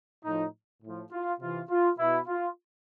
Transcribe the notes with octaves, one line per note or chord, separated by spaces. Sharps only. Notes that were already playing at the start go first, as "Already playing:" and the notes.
A2 F3 D#4
A2 F3
F4
C3 E3 F4
F4
B2 E4
F4